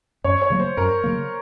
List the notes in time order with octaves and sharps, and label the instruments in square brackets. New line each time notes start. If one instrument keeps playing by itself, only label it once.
[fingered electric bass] F#2 [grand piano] C#5
[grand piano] C#5
[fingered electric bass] C#3 F#3 A#3
[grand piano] C5
[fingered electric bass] F#2 [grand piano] A#4
[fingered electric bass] C#3 F#3 A#3